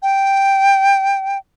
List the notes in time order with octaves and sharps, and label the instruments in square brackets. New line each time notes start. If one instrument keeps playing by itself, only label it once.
[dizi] G5